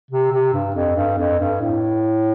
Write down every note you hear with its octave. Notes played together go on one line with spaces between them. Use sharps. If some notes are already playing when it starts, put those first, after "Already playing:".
C3
C3
G2
F2
G2
F2
G2
A2